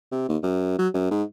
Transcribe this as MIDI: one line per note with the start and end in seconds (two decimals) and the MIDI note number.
0.12 0.26 48
0.29 0.38 39
0.43 0.76 42
0.79 0.88 54
0.94 1.09 42
1.11 1.23 44